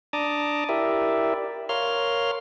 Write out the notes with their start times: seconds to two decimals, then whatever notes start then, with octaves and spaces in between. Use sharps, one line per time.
0.13 D4 A5 A#5 D6 D#6
0.69 E4 G4 A#4 D5 E5
1.69 A#4 C#5 F5 C6 F6